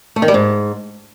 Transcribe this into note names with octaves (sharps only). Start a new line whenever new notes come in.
A3
D#3
G3
G#2